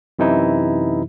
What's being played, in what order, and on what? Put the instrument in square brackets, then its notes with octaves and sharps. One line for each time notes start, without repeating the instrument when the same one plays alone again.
[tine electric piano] F#2 C3 E3 D#4 E4